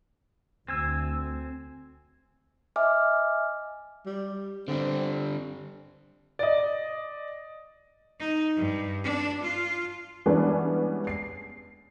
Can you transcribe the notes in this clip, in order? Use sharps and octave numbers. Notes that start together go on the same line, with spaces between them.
D2 C4 G#5 E6
D#5 E5 G#5 D6 F6
G3
D3 G3 C4
D5 D#5
D#4
G2
D4
F4
E3 G3 G#3 B3 C#4 D4
C7